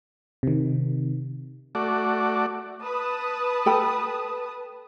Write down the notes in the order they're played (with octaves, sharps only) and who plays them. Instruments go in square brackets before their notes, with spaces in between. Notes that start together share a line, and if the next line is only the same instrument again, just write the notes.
[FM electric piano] C3 D#3
[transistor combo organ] A3 F#4 D5
[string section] B4 A5 D#6
[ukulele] A4 G5 B5